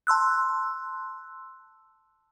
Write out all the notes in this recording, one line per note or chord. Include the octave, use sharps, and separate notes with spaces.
A5 C6 E6 F#6